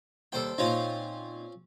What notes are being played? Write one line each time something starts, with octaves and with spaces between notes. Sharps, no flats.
D#2 G3 A4 C5 G5
A#2 C4 C#4 D#4 F4